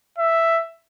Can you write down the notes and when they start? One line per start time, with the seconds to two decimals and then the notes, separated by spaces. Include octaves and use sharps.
0.18 E5